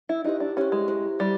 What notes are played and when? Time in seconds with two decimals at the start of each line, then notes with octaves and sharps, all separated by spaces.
0.09 E4
0.25 D#4 E4 G4 C5
0.40 D4
0.57 C#4 E4 G4 C5
0.72 G#3
0.88 E4 G4 C5
1.19 G3 E4 G4